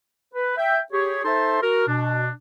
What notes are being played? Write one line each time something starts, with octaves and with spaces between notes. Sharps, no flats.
B4
E5 G5
G4 G#4 C#5
D#4 A4 C5 E5 A5 C6
F#4 A#4
B2 D4